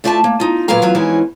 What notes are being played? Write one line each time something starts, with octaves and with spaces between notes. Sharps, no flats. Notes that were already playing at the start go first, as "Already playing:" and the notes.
A3 F4 D5 E5 G#5 A5
A#3
D#4 F4
A#2 F#3 A#4 B4 F5 A#5
E2 F#3 F4
F2 G#2 E3 C#4 F#4 G#4